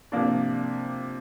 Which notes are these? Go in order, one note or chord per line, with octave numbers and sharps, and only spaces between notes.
C3 F3 A#3 D4